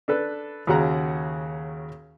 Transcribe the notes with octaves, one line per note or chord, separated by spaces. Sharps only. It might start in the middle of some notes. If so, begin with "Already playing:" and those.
D4 A4 B4
D#2 C#3 F#4 F#5 A#5